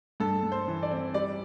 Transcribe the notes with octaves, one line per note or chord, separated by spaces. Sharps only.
G2 A4
G2
C5
E3
D5
C4
G3 D5